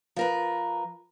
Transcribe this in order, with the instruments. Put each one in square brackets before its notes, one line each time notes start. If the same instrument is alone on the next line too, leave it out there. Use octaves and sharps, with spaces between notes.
[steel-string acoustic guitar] F3 A#4 B4